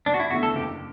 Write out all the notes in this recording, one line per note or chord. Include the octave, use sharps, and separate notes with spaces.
F#1 D4
F#4
E4
E2 D3 A3 E4 F#4
A4
F#1 G4